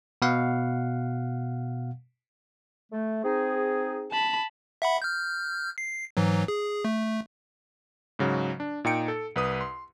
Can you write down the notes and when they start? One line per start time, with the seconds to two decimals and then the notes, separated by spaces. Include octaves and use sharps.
0.22 B2 F5 F#5
2.92 A3
3.24 C4 D#4 G#4
4.12 A5 B5
4.82 E5 F#5 B5
5.02 F6 G6
5.78 C7
6.17 G#2 E3 F#3
6.48 G#4
6.85 A3
8.19 G#2 C#3 F#3
8.60 D4
8.85 A#2 D#4 G5 C#7 D7
9.08 A4
9.36 C2 B4 D#6
9.61 C6